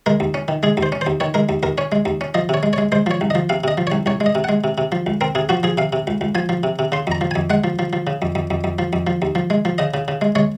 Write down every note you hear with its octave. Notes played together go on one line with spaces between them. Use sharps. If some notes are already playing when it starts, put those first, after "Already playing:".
G#3 A#4
D#2
C#4
D#3
G#3 G#4
D#2
C5
C#4
C5
D#2
D#3 C#5
G#3 A#4
D#2
D#2 A#4
C#4 C#5
G#3
D#2
C#4
F3 D#5
C3 C#5
G#3
C#5
G#3
G#3 C5
F3 C#5
C2
D#5
F3
C3 F5
C3 D#5
F3
C#5
C2
C2 C#5
G#3
D#5
C3
G#3 F#5
C3
C3
F3
C#2
C4 A#4
C3 G#4
F3 F#4
F3 G#4
C3 F5
C3
C#2
C#2
F3 G#5
F3
C3
C3
C#3 C6
F2 A#5
F3
G#5
F2
G#3 F#5
F3
F3
F3
C#3
F2
F2
F2
F2
F3
F2
F3
D#2
F3
G#3
F3
C#3 D#5
C#3
C#3
G#3
G#3 C#5